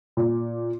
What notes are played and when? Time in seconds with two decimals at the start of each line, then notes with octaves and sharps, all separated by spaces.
0.17 A#2